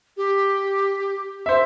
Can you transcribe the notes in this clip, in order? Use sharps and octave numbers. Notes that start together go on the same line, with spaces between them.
G4
C5 E5